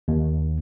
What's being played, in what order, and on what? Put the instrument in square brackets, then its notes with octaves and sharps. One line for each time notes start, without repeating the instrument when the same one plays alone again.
[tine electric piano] D#2